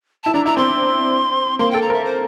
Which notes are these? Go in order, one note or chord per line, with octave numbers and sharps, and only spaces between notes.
E4 A5
D4 A#5
E4 A#5
C4 C6
A#3 C6
A4 G5
A#5
A#4 E5
C5